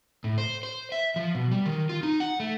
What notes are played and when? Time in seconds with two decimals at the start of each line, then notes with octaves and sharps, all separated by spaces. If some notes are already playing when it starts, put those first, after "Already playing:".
0.24 A2
0.38 C5
0.63 C5
0.92 E5
1.16 F3
1.35 B2
1.51 G3
1.66 D#3
1.89 F4
2.03 D#4
2.20 F#5
2.40 A3